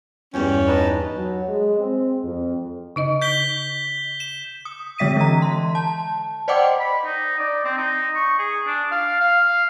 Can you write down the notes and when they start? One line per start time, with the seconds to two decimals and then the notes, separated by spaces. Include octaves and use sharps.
0.34 E2 G2 C#4 G5
0.67 D#4 B4 A5
1.16 F#3
1.48 G#3
1.79 C4
2.24 F2
2.96 C#3 D#4 D#5
3.22 G6 B6 G7
4.20 E7
4.65 D#6
4.98 D3 G#3 E5 B6 D#7
5.16 E3 A#5
5.42 C6
5.75 A5
6.48 C5 D5 D#5 F#5 G5 D6
6.80 B5
7.05 D#4
7.39 D5
7.65 C4
7.78 D#4
8.16 C#6
8.39 G#4
8.67 D4
8.92 F5
9.20 F5